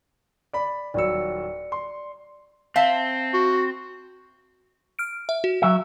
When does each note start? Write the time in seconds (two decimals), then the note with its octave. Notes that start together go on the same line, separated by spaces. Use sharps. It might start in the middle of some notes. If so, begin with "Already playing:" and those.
0.53 D5 B5
0.94 D#1 F#3 D5 E6 C#7
1.72 C6
2.76 C4 E5 F5 A5
3.34 F#4
4.99 F6 D7
5.29 E5
5.44 F#4
5.62 F#3 E5